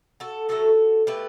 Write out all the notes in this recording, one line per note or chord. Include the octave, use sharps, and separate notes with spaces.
F#4 A4
A2 F#3 A3 F#4 A4
B2 A3 G4 B4